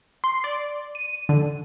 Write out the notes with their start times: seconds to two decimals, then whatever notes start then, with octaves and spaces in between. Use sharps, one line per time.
0.24 C6
0.44 D5
0.95 D#7
1.29 D3